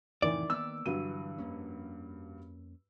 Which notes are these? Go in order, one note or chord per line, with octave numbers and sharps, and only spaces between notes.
F2 A2 C3 D#3 E3 D5
D#3 A#3 B3 E6
G2 D3 E3 F#3 F#4 D#7
F2 A#3 C#4